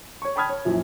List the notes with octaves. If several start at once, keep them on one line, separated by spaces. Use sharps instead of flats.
C#5 C#6
G5 A5 B5 D#6 F6 G#6
C#5
F#2 A#2 F3 E4